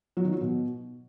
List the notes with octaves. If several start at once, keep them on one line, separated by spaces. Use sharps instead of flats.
F#3
D#3
F#3
B2